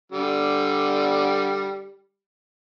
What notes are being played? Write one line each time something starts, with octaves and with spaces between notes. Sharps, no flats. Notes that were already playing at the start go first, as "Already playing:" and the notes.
D3 G3